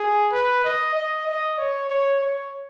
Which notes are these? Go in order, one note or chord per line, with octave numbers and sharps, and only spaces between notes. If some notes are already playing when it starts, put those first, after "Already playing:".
Already playing: G#4
B4
D#5
D#5
D#5
C#5
C#5
C#5